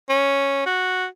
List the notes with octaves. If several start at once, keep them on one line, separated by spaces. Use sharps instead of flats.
C#4
F#4